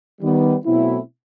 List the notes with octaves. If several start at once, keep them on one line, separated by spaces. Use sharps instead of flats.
D#3 G3 B3
B2 F#3 A3 C4 E4